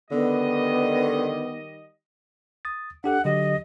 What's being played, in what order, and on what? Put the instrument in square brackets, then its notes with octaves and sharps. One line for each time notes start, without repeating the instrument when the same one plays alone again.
[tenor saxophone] D3 [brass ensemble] D#3 G3 D#5 [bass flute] B3
[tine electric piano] D#6 A6
[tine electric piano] D4 G4 A4 [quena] F#5
[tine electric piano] D3 F#3 G4 [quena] D#5